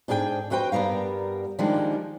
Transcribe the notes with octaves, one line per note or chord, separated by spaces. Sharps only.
G#2 D4 G#4 A#4 G5
F2 F#4 B4 C5 G5
G2 G3 B3 A#4 F5
D#3 F3 G3 G#3 A#3 D4